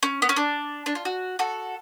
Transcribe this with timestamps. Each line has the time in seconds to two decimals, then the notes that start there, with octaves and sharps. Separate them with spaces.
0.03 C#4
0.22 B3
0.29 C#4
0.37 D4
0.86 D4
0.95 F4
1.05 F#4
1.39 F#4 A4